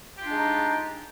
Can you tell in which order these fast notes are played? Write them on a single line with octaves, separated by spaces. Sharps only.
G4 F4 D4 G#3 D#4